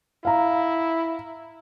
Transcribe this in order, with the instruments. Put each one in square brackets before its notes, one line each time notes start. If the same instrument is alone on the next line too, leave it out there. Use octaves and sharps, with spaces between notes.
[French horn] E4 [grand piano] F5 A#5